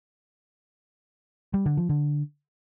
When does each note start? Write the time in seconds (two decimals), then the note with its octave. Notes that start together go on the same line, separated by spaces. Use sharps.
1.54 G3
1.66 D3
1.77 F3
1.89 D3